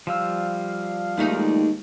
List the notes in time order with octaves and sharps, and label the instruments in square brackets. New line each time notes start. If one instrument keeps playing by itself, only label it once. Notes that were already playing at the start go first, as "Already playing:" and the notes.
[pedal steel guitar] F3 G3 E6 [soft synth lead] F5
[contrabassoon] D#2 [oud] G#3 A3 D#4